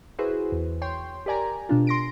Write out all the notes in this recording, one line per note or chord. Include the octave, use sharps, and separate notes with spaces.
E4 F#4 G#4 B4 C5
E2
C#5 G5 C6
G4 A#4 D5 G#5 A#5
B2 D4 F4
C6 A#6 D7